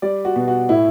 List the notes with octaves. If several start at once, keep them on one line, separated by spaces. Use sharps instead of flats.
G3 D5
F#4
B2
F#4
A2 E4